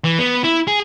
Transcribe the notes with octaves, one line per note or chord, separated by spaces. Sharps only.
E3
B3
E4
G#4